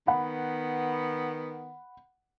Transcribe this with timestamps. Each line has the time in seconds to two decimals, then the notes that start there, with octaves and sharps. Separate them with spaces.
0.07 D#3 B3 F#5 B5